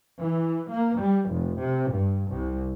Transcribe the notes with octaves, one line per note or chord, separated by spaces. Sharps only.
E3
A#3
G3
F1
C3
G2
C2